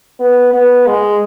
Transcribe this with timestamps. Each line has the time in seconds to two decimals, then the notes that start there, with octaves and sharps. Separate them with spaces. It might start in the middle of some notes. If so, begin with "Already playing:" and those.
0.20 B3
0.54 B3
0.87 G#3